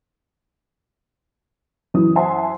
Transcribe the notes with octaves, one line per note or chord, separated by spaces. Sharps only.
F#2 E3 E4 D#6
C5 E5 F#5 G#5 A5 C6